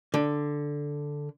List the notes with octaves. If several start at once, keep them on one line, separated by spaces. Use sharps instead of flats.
D3